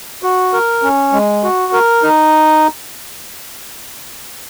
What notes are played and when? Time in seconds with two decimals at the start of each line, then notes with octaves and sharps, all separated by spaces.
0.23 F#4
0.53 A#4
0.83 C#4
1.12 G#3
1.43 F#4
1.73 A#4
2.03 D#4